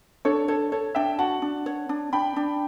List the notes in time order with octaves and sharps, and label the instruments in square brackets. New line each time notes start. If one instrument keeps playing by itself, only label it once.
[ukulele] D4 [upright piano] A4 C#5
[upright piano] A4 [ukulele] C#5
[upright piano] A4 [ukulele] C#5
[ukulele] D4 [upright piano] E5 G5
[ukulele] F#4 [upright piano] F#5 A5
[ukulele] D4
C#5
D4
[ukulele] D4 [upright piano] G5 B5
[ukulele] D4